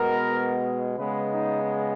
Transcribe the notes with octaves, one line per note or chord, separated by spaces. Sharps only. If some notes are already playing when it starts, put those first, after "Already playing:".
Already playing: B2 G#3 B3 A#4
C#3 G#3 B3 B4
D#4